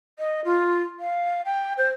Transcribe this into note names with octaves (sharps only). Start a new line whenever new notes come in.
D#5
F4
F5
G5
C5